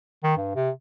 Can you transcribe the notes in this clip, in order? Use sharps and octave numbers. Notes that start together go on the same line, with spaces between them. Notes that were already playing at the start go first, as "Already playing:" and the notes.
D#3
G2
C3